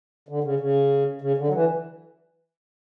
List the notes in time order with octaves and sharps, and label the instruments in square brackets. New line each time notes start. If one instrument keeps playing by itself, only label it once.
[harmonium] D3
C#3
C#3
C#3
D3
F#3
E3